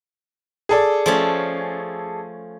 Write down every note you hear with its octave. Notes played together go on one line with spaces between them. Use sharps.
G#4 A4 D5
F3 A3 C#4